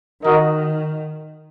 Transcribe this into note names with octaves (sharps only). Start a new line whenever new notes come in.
D#3 F#4 A#4 D#5